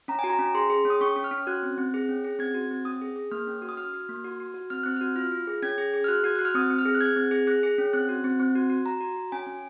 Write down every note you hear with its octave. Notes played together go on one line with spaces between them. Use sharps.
C#4 A#5
F#4 G#5
A#5
C#4
G#4 C6
G#4
C#4 D#6
C#4 C#6
C#4
F6
C#4
F#4 F#6
C4
C4
G#4
C#4
G#4
C4 G#6
F#4
C4
C#4 D#6
G#4
G#4
A#3 F6
C#4
F#4
D#6
F#4 F6
F#4
A#3
F#4
F#4
F#4
C4 F6
C4 F#6
F#4 F6
F4 F6
F4
G#4
C#4 G#6
G#4
G#4
F6
F#4 F#6
F#4 G#6
F#4 F#6
F6
C4 D#6
C4
F6
G#4
F#6
G#4 G#6
C4
G#4
G#4 F#6
G#4
C#4
C4 F#6
F#4
C4
C4
F#4
F#4
F#4 A#5
F#4
F#4
C#4 G#5
C#4